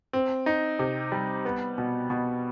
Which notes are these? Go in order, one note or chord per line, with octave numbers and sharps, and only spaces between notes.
C4
D#4
C3
G3
B3
B2
B2